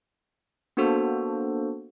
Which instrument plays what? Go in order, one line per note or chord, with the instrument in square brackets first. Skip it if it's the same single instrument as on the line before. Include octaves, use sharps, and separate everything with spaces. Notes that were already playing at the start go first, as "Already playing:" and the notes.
[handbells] A#3 B3 D4 F#4 A4 C5